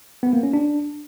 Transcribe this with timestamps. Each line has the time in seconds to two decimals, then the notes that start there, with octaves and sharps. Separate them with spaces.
0.23 B3
0.33 A#3
0.43 C#4
0.53 D4